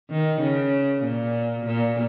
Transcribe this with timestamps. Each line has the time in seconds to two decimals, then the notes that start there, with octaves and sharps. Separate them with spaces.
0.10 D#3
0.41 C#3
1.04 A#2
1.66 A#2